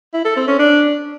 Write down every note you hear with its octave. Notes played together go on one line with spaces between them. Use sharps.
E4
A4
C4
C#4
D4